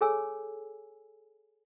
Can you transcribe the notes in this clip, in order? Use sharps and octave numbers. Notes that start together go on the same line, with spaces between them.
G#4 A4 C#5 G#5 E6